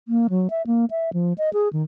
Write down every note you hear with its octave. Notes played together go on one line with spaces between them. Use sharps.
A#3
F#3
E5
A#3
E5
F3
D#5
G#4
D#3